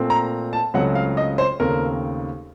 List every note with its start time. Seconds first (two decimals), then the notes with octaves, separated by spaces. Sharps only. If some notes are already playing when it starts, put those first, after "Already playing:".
Already playing: A#2 A3 C4
0.10 A#5
0.53 A5
0.74 C#2 C#3 F#3 A3 C4 F#5
0.95 F5
1.17 D#5
1.38 C5
1.60 D#2 C#3 A3 C4 A#4